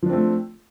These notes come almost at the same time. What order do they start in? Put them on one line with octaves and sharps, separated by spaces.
F3 D4 C4 A3